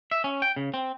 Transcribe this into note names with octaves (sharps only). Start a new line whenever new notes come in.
E5
C#4
G5
C#3
C4